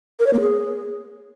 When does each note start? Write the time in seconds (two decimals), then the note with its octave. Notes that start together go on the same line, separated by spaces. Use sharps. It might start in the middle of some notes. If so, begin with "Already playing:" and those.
0.20 A#4
0.27 C#5
0.33 A#3
0.40 G#4